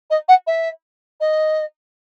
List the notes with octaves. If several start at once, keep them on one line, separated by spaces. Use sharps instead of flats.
D#5
F#5
E5
D#5